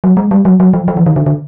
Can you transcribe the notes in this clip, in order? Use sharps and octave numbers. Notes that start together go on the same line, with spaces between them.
F#3
G#3
G3
F#3
F#3
F3
F3
E3
D#3
D3
D3